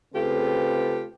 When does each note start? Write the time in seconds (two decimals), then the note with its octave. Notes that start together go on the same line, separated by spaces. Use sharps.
0.14 C#3 A3 C4 F4 G4 B4